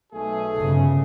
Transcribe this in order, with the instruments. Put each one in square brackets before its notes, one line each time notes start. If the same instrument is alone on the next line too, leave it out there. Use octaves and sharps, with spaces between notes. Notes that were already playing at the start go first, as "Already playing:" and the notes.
[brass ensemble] B1 A3 G#4
[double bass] G1 C#3